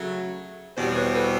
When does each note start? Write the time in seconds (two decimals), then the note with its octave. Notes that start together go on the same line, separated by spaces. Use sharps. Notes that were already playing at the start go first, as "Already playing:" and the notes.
Already playing: C#3 F#3 A3
0.77 E2 B2 G3 C4 C5 D5
0.96 B4 C#5
1.14 A4 B4